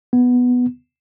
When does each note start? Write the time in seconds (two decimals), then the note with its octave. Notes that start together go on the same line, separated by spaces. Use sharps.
0.13 B3